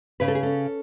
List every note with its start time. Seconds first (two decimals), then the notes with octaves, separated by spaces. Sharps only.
0.20 C#3 B4
0.28 A4
0.35 G#4
0.43 C#4 A4